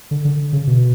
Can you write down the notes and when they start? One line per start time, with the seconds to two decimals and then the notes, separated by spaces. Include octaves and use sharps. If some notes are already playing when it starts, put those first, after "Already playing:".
0.11 D3
0.25 D3
0.53 C#3
0.67 B2